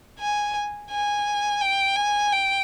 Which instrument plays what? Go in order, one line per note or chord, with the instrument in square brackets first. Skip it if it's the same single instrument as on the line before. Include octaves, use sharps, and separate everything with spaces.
[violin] G#5
G#5
G5
G#5
G5